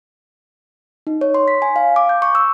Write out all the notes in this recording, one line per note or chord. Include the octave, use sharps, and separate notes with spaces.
D#4
C#5
C6
B6
G#5
F5
D6
G6
C#6
E6